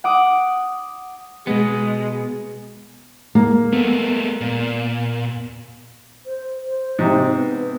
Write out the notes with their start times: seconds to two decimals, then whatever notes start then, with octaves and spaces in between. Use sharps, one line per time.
0.04 F#5 D6 D#6
1.47 B2 G#3 B3
3.35 A#3
3.73 G#3 A3 B3
4.41 A#2
6.26 C5
6.67 C5
6.99 G#2 C3
7.33 B3